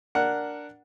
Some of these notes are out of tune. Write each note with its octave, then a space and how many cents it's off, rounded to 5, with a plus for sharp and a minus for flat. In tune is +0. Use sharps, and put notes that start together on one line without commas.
D4 +0 A#4 +0 F#5 +0